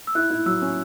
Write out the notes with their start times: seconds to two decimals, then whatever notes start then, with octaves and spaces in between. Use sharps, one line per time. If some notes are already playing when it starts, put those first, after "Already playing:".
0.07 E6
0.15 E4 F#6
0.30 E4
0.46 F#3 E6
0.62 C#4